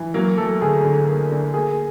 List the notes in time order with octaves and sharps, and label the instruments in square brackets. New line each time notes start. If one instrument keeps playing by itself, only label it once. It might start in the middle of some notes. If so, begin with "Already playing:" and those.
Already playing: [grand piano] E3
F#3 A#3 A#4
F#3 A3 A4
D2 G#4
D3
A#3
D3
A#3 G#4